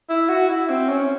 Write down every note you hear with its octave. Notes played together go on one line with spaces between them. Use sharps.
E4
F#4
E4
C4
C#4
C#4